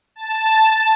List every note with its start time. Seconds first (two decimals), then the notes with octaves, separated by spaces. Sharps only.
0.16 A5